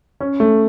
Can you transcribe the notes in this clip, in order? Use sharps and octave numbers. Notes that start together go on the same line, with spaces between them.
C#4
A3